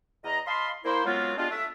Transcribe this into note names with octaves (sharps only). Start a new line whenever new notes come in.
E2 D#5 A#5
D#5 F5 A5 B5 C6
A#3 E4 C5
F#2 F#3 G#3 B3 C4 F4
G3 G#3 B3 D4 F4
A3 D4 E5